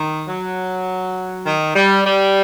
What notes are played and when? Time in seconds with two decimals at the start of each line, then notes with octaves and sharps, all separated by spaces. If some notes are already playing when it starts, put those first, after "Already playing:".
Already playing: D#3
0.28 F#3
1.46 D#3
1.76 G3
2.05 G3